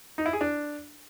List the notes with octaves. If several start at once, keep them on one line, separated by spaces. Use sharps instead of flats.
D#4
E4
G#4
D4